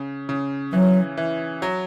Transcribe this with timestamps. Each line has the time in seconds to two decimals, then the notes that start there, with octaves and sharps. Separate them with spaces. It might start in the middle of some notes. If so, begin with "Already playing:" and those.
Already playing: C#3
0.29 C#3
0.73 E3 F#3
1.17 E3
1.62 F#3